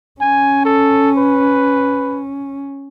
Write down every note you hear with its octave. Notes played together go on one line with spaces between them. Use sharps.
C#4 G#5
A4
B4